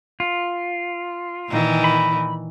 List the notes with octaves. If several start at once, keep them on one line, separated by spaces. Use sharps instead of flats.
F4
A#2 D#3 E3
B5